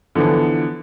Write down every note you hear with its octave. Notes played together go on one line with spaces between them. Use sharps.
D3 E3 F3 B3